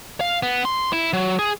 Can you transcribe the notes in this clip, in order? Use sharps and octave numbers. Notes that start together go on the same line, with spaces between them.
F5
B3
C6
E4
F#3
G#4